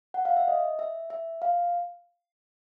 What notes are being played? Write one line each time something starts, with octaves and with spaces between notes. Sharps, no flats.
F#5
F5
E5
D#5
E5
E5
F5